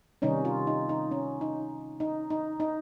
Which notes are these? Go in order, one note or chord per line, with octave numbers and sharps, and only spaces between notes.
C3 D#3 G3 C#4 D#4
F4
D#4
D#4
C#4
D#4
D#4
D#4
D#4